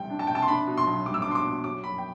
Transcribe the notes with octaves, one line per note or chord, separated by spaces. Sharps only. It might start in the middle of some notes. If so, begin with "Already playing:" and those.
Already playing: C2 C3 G3 G5
D4
A5
C3 G5
A5
C6
D4 B5
B2
C6
B1
G3 D6
E6
D4 D6
C6
D6
B2
F#3 D6
F#2 B5
G5